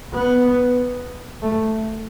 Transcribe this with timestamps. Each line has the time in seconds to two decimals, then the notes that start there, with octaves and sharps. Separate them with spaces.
0.14 B3
1.42 A3